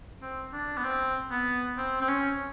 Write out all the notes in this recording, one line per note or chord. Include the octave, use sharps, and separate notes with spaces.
C4
D4
B3
C4
B3
C4
C4
C#4